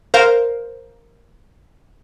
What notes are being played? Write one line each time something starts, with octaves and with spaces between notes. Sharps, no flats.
A#4 C5 F5